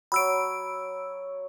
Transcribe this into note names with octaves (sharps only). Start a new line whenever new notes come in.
F#3 C#5 B5 E6 D7